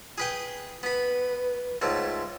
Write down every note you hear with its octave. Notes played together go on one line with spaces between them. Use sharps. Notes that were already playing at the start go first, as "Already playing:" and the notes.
G#4 B4 G5
B3 B4 B5
C#2 G#2 A3